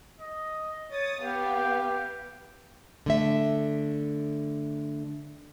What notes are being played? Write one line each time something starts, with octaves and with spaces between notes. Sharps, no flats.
D#5
C#5 D#6 A6
B3 G4 F5
D3 A3 E5